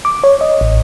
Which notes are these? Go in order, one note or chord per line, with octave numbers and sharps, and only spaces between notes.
D6
C#5
D#5
A1